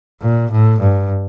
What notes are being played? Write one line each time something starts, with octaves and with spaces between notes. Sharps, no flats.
A#2
A2
G2